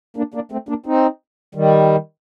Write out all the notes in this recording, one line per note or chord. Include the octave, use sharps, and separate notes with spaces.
A#3 D4
A#3 D4
A3 C4
A#3 D4
C4 D#4
D#3 G3